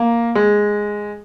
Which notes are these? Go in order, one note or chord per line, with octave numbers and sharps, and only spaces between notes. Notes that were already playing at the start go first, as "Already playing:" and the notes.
Already playing: A#3
G#3